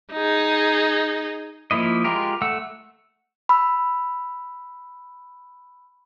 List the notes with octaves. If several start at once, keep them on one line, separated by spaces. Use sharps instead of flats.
D#4 G#4
F3 A#3 E4 D#5
G#3 F4 G4 A#4
A3 F#5 E6
B5 E6